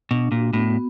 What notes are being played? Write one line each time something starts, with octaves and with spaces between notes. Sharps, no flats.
B2 D4
A#2 F#4
A2 B3